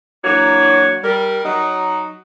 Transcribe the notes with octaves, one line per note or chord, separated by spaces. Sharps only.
E3 F#3 A#3 D4 F#4 C#5
G3 A#4
F#3 D#4 F#4